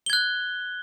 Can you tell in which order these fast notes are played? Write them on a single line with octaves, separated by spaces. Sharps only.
G7 G#6 F#6